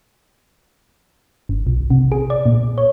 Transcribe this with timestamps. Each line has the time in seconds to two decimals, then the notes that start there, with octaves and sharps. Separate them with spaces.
1.49 G1
1.67 B1
1.90 C3
2.12 G#4
2.30 D5
2.46 A#2
2.78 C#5